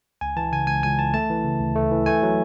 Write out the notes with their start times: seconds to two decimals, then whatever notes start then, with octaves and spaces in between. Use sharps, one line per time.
0.21 C#2 G#5
0.36 E3 A5
0.52 C#3 G#5
0.67 C#2 G#5
0.83 C#2 G#5
0.99 E3 A5
1.14 A3 A5
1.30 E3
1.45 C#3
1.60 D2
1.75 A3
1.91 E3
2.06 A3 G#5
2.23 F#3